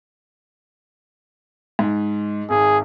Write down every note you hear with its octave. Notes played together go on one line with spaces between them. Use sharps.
G#2
G#1 G#4